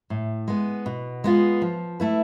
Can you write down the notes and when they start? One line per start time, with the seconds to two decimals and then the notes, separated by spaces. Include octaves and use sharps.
0.10 A2
0.48 G#3 B3
0.86 B2
1.24 G#3 B3 F4
1.62 F3
2.00 A3 E4 B4